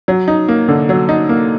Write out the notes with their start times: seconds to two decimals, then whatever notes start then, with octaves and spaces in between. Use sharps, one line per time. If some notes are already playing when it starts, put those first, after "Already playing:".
0.08 F#3
0.28 D#4
0.48 A#3
0.68 D3
0.89 F#3
1.09 D#4
1.29 A#3